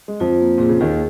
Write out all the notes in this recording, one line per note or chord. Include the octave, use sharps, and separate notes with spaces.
G#3
F2 F3 F4
A#3
A#2 G#4
C#3
D#2 D#3 G#4